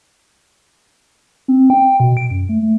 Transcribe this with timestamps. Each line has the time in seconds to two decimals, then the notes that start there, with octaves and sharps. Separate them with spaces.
1.48 C4
1.70 G5
2.00 B2
2.17 D7
2.30 F#2
2.49 A3
2.62 A3